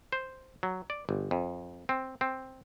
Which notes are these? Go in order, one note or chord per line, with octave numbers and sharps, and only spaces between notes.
C5
F#3
D5
G1
F2
C4
C4